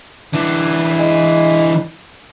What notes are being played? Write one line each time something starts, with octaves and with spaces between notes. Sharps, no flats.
E3 D4
G#3